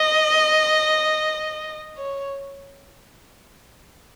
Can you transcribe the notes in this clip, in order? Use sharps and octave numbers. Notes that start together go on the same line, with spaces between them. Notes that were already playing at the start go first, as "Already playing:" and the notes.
Already playing: D#5
C#5